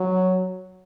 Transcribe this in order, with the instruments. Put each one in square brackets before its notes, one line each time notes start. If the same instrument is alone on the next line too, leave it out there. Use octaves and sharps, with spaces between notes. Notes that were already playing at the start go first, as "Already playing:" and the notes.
Already playing: [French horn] F#3